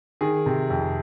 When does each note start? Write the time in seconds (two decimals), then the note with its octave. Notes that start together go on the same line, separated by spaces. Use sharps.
0.21 D#3 G#4
0.46 C3
0.70 F2